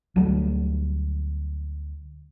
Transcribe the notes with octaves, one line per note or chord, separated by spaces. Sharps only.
D2 F#3 G3 A3